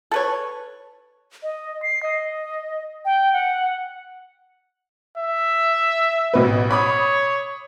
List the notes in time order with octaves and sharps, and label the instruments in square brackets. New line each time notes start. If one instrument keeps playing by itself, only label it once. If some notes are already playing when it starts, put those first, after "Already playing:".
[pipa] A4 B4 C#5
[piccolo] D#5
C7
D#5
G5
F#5
[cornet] E5
[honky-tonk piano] A1 B2 B4
[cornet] C#5 [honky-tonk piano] B5 D6 D#6